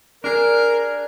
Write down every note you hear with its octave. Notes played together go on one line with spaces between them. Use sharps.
D4 G#4 A#4